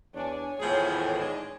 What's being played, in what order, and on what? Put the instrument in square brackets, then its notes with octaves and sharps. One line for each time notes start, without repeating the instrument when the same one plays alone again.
[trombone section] E2 D4 [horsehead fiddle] C#5 G#5
[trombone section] G#1 E2 E3 [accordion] A2 [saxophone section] F3 G#4
[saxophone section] G#3 D4 D#4